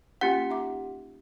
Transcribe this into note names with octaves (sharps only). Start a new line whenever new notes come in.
A#3 C#4 F4 G4 F#5
D#4 E5 D6